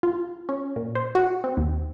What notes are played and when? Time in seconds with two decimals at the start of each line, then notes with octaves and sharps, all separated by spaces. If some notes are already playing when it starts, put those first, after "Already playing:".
0.03 F4
0.49 C#4
0.76 A#2
0.95 C5
1.15 F#4
1.44 C4
1.57 D#2